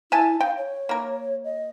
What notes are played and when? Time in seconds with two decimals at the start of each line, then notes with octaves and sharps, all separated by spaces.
0.12 E4 E5 G#5 A5
0.40 F5 G5
0.57 C#5
0.89 A#3 A#4
1.44 D#5